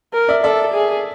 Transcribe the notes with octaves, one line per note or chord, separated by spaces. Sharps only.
A#4
D5 E5
A4 D5 E5
G#4